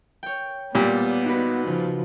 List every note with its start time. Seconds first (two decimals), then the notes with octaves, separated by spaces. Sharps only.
0.23 C#5 G5
0.75 A#2 G3 B3
1.24 D#4 F#4 B4
1.67 C#3 F3